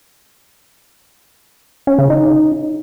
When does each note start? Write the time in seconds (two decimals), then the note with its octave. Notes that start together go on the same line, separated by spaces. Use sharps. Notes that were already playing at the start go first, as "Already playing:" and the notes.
1.87 C#4
1.99 C#3
2.10 D#4